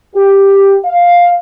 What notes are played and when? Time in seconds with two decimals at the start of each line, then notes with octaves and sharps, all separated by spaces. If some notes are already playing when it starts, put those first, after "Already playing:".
0.15 G4
0.84 F5